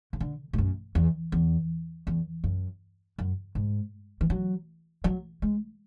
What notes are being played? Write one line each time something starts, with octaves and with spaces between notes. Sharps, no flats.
C#3
D3
G#2
F#2
E2
E2
E2
F#2
F#2
G#2
E3
F#3
F#3
G#3